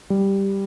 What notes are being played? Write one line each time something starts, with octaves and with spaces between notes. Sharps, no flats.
G3